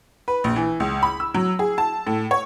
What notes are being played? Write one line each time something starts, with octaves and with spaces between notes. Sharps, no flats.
B4
A#1
E3
C#2
B5
E6
F#3
G#4
A5
A2
C#5